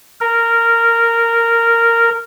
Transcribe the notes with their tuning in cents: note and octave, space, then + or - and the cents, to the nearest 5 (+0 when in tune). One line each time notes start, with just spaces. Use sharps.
A#4 -10